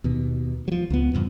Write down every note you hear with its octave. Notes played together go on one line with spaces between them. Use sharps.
D#2 B2
F3 F#3
C#2 B3
E2 G2 C3